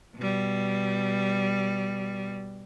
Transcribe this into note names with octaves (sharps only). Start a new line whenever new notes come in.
B2 G3